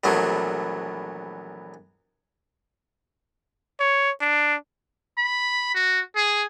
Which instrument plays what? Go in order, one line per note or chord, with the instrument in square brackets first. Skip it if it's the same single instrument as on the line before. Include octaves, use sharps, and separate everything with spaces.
[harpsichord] A#1 E2 F#3 A3
[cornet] C#5
D4
[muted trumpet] B5
F#4
G#4